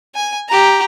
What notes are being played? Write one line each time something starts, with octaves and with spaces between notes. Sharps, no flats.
G#5
G4 A#5